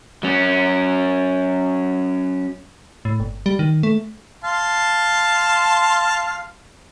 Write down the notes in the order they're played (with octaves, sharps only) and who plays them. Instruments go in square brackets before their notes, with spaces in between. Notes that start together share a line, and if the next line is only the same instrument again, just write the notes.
[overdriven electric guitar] F#3 C#4
[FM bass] A2
G1
G3
D#3
A3
[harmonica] F5 A5 C6